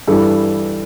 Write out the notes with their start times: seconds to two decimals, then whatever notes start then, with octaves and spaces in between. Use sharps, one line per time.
0.08 G2 E3 G3 A4